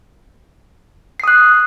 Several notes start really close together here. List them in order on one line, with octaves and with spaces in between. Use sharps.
C7 D#6 F#6